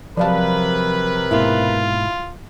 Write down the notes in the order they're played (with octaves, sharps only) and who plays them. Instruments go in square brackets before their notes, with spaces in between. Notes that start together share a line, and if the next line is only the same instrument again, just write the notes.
[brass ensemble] C3 A#4 B4 [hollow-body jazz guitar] F3 F#3 A5 [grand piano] D5 F5
[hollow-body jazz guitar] G#2 B2 A#3 [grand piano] E4 [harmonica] F4